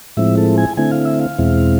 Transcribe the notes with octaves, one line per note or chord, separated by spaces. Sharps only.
A2 F3 G#3 C4 E4 E5
A4
G#5
D3 A3 C4 E4 G#5
F5
E5
F5
E2 B2 G#3 C4 E4